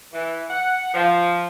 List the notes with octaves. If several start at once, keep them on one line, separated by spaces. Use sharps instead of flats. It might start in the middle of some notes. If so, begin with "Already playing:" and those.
E3
F#5
F3